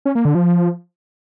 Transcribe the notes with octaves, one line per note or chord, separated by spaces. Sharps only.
C#4
A#3
D3
F3